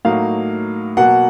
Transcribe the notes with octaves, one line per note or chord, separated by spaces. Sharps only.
A2 F#3 A#3 D#4 F5
B2 F#3 A#3 F#5